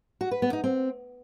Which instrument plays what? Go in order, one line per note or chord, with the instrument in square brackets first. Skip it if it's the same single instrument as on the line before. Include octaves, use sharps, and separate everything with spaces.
[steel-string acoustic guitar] F#4
B4
B3
D#4
C4